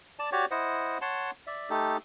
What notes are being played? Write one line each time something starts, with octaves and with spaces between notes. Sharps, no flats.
D5 A5
F#4 G4 C#5 D5
E4 C5 D#5 F#5
C#5 F#5 A5 C6
D5 E5
A3 D#4 G4 A4